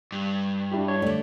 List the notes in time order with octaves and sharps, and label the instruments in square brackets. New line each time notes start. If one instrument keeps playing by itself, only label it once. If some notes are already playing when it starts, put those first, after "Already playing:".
[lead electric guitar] G2
[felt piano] D4 E4 G4
[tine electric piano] C#5
[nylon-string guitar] D3 A3 [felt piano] D5